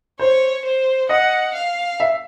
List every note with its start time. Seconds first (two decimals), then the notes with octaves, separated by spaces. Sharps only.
0.19 C5 C#5
0.65 C5
1.09 D#5 F#5
1.55 F5
2.00 E5